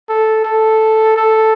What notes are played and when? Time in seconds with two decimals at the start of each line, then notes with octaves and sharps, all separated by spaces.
0.09 A4
0.45 A4
1.17 A4